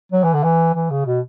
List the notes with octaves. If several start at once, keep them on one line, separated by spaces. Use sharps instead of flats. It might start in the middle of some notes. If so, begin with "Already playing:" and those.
F#3
E3
D3
E3
E3
C#3
B2